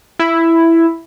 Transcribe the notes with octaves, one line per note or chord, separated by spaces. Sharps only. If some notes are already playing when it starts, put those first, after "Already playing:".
E4